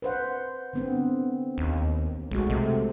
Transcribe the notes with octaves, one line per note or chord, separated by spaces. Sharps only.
B4 C5 F#5
D3 B3 C4
D#2
B1 G#3 A3 F#4
C3 A3